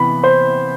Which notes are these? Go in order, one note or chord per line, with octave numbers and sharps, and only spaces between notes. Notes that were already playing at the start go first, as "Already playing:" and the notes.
Already playing: C3 E3 B3 B5
C5